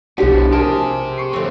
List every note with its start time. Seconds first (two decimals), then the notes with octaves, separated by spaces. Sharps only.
0.18 B1 E2 A2 F3 D4 F#4 G4
0.52 G4 G#4 A#4 C5 A5 D7
1.18 C#6 C7
1.33 F2 D3 A3 C4